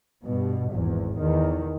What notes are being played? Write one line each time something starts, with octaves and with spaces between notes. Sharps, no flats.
G2 B2
G#1 E2
E2 D#3